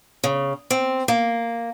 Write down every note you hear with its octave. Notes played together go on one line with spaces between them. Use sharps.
C#3
C4
A#3